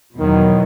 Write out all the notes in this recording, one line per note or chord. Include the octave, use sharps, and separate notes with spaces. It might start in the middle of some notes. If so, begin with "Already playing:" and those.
E2 B2 D#3 F#3 B3